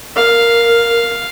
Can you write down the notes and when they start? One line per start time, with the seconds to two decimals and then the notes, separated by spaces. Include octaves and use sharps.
0.16 A#4 F5